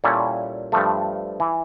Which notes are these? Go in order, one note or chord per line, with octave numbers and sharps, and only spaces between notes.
A#2 G3 C#4 E4 A4
G2 F3 A3
E3